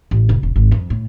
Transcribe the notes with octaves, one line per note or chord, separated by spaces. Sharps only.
A1
F1
E1
G#1
F2
A2